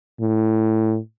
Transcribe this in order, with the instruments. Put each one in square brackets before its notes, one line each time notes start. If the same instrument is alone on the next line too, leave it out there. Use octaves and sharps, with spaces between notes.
[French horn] A2